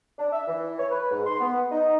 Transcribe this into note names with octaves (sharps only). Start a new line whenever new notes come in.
D4
E5
E3
C#5
B4
G#2
C6
B3
D#4